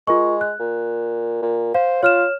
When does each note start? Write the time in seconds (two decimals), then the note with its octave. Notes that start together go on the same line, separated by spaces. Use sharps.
0.07 G#3 F4 A#4 C#6
0.41 F#6
0.59 A#2
1.42 A#2
1.74 C5 F5
2.03 F4 C#5 F6 E7